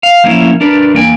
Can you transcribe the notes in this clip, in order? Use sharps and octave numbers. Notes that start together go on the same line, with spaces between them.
F5
F3 A#3 C#4 E4
D4 A#4 B4 D5
E2 A#3 G5 G#5